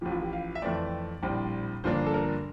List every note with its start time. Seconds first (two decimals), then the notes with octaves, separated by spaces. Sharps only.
0.01 A1 A2 F3 G4
0.12 F4
0.22 G4
0.33 F5
0.55 E5
0.62 F2 E3 A3 C4 D5
1.23 A#1 A2 G3 C4
1.84 G1 G2 F3 A#3 D4 C5
2.06 A4
2.14 A#4